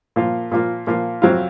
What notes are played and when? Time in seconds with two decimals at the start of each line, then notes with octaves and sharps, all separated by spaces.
0.16 A#2 F3 A#3 F4
0.52 A#2 F3 A#3 F4
0.87 A#2 F3 A#3 F4
1.22 F2 C3 F#3 C4 F4